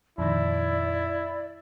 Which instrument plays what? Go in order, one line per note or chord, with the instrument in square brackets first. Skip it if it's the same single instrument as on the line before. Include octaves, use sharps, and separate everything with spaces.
[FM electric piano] F2 A#2 D#3 [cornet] E4 [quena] D5